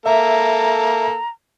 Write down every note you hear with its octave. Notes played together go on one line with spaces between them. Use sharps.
A#3 A4 E5 A#5